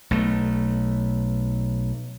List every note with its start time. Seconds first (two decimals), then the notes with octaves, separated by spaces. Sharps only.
0.11 B1 A3